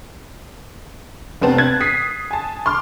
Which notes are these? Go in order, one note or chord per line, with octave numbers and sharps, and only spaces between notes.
F1 B3 C4 A5
F#6 G#6 A6
D#6 B6 C7
G#5 A5
C6 D6 F6